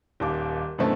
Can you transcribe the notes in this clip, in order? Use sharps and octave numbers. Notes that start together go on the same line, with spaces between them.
D#1 D#2 D6
F#2 B2 D3 E3 A3 C4